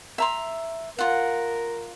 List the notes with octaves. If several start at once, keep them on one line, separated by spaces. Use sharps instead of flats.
E5 A#5 C6
F4 A#4 F#5